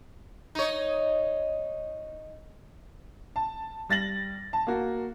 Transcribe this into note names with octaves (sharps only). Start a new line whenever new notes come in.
D#4 C#5
A5
G3 A6 A#6 F#7
A5
A#3 F#4